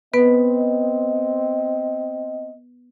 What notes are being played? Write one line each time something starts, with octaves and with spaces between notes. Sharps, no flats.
B3 C4 B4 D#5